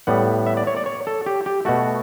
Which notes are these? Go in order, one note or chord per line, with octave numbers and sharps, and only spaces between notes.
A2 G3 B3 F#5
E5
D5
C#5
D5
C#5
A4
G4
G4
B2 A3 F#4